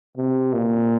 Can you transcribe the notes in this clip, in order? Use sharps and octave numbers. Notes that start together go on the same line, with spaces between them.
C3
A#2